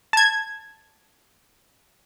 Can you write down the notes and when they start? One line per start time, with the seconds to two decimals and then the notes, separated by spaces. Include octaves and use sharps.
0.13 A5 G#6